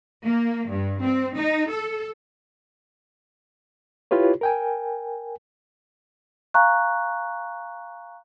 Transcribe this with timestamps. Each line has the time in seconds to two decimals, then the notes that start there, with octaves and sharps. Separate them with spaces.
0.25 A#3
0.69 G2
1.02 C4
1.36 D#4
1.69 A4
4.11 E4 F4 G4 B4 C#5
4.41 A#4 G5 G#5
6.54 F5 G#5 A#5 C#6 F#6